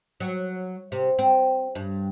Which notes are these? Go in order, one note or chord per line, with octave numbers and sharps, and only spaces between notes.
F#3
C3
C4
G2